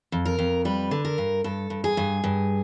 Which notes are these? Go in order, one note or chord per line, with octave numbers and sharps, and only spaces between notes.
F2
A#4
F2
G3 B4
D3
A#4
G2
G2 A4
G2
G#4
G2
G2